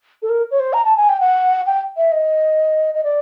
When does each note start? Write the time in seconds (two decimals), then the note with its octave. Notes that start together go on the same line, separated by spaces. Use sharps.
0.22 A4
0.29 A#4
0.51 C#5
0.60 C5
0.73 A#5
0.85 A5
0.97 G#5
1.09 G5
1.20 F#5
1.66 G5
1.97 E5
2.12 D#5
2.95 D#5
3.04 D5